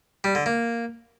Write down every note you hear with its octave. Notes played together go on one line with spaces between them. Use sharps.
G3
D3
A#3